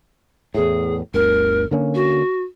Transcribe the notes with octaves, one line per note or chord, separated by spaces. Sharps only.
E2 A2 G#4
G1 D2 A#4
D3 A#3 C#4
F#4